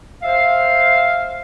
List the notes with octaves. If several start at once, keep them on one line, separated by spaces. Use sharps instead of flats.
C5 E5 F5